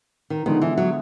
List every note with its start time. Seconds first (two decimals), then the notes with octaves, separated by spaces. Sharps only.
0.30 D#3
0.46 D3 D#3 F3 G#3 B3
0.62 E3
0.78 F#3